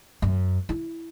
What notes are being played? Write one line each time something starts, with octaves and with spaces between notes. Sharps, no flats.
F#2
E4